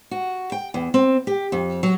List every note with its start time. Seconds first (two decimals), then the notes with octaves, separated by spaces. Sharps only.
0.11 F#4
0.52 G5
0.74 E2
0.94 C4
1.27 G4
1.52 F2
1.83 F#3